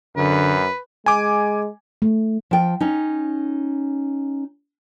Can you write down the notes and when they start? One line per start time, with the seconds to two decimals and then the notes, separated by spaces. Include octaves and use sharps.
0.17 F#2 D3 B4
1.06 G#3 G#5 D6
2.02 A3
2.51 F3 G5
2.80 C#4 D#4